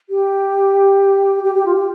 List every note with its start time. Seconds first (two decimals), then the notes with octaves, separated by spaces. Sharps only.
0.09 G4
1.43 G4
1.54 G4
1.65 F4
1.74 G4